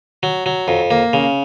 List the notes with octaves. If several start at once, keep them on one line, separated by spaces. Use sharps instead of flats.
F#3
F#3
F2
A#3
C#3